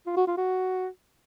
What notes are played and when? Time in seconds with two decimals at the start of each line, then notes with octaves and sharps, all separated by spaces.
0.06 F4
0.17 F#4
0.27 F4
0.38 F#4